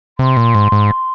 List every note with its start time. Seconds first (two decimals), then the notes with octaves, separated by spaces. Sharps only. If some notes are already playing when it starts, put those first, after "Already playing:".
0.18 C3 C6
0.37 A#2
0.55 G#2
0.72 G#2